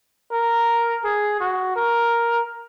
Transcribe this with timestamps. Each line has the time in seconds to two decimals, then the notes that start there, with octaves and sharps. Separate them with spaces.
0.32 A#4
1.04 G#4
1.40 F#4
1.76 A#4